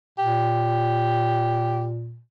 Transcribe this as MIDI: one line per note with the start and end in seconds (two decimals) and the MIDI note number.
0.19 2.20 46
0.19 1.86 67